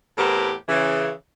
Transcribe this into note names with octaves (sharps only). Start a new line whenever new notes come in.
E2 A2 B3 C4 G4 A#4
C#3 E3